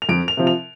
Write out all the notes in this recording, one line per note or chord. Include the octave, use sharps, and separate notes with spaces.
F7
F2 D7
F7
C3 F3
F7